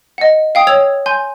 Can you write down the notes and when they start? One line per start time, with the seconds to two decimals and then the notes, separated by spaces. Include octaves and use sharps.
0.18 D#5 F#5
0.55 F5 G5 D#6
0.67 C#5 E6 G#6 F7
1.06 G#5 C6 G6